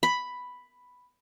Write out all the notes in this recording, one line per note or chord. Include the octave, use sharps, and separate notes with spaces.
B5